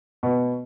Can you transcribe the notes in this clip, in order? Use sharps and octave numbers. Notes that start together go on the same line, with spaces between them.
B2